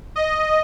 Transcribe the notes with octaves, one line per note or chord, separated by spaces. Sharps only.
D#5